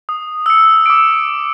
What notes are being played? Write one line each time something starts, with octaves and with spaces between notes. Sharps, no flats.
D#6
E6 C#7
D6 E6 D7